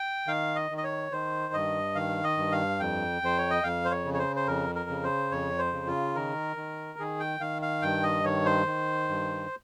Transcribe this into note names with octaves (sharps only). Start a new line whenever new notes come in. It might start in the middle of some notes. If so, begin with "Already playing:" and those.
Already playing: G5
D#3 F5
D#5
D#3
D#5
C#5
D#3 C5
G2 D#5
D#3 F5
D#5
G2
F5
F2 G5
F2 C5
C#5
D#5
F2 F5
C5
C#5
C#3
C#5
C5
C5
F2 A#4
A#4
C#3
C5
F2 C#5
C5
C#3
F4
D#3 A#4
D#3
D#3 G#4
G5
D#3 F5
F5
G2 G5
D#5
D#3 C#5
C5
D#3
G2